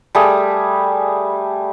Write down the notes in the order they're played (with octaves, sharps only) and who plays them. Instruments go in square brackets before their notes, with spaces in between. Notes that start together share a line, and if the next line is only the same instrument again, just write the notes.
[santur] G3 A3 G#4